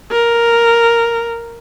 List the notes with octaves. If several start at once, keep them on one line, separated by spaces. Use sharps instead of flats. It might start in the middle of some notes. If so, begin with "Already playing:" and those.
A#4